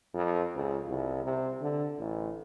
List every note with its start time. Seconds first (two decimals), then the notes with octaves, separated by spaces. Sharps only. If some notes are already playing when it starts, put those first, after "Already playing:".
0.14 F2
0.55 C#2
0.88 C2
1.25 C3
1.61 D3
1.98 A1